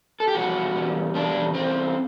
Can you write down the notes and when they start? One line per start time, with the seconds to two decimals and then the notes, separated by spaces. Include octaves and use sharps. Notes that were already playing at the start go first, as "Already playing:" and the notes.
0.20 A4
0.28 G4
0.35 E2 B2 G3 F#4
0.74 E2 B2 G3
1.14 E2 B2 G3 D4
1.54 E2 B2 G3 C4